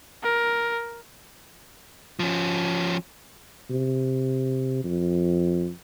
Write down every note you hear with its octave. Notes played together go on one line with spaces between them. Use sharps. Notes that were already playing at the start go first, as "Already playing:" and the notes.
A#4
F3 C#4
C3
F2